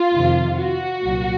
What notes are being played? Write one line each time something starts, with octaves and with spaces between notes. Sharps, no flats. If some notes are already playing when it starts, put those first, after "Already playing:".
Already playing: F4
F2 C3 D#3
F#4
C2 A#2 F#3